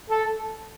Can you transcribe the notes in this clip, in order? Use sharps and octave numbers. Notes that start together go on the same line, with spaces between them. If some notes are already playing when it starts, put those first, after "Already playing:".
A4